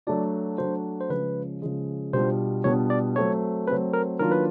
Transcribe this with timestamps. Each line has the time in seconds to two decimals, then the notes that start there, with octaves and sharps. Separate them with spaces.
0.07 F#3 A3 D4 F#4 D5
0.58 F#3 A3 D4 F#4 C5
1.00 C5
1.09 C#3 F3 G#3 B4
1.62 C#3 F3 G#3
2.13 B2 G3 B3 D4 F4 C5
2.64 B2 G3 B3 D4 F4 C#5
2.90 D5
3.16 F#3 A3 C4 C#5
3.67 F#3 A3 C4 B4
3.93 A#4
4.19 D#3 F#3 A#3 D4 F4 A#4
4.31 B4